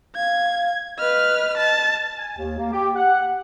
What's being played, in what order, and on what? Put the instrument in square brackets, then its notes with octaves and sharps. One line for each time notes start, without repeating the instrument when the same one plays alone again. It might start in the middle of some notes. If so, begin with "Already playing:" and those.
[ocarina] F5 [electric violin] G#6
[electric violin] B4 F6 [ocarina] D#5
[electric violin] A5
[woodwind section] G#5
D#2
A#3
G4
F#5